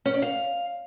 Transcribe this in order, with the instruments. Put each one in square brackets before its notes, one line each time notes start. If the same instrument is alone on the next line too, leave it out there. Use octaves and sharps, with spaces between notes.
[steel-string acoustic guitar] C#4
D5
F5